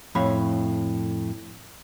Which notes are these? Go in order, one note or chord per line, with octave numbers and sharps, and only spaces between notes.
F2 A2 C#5 B5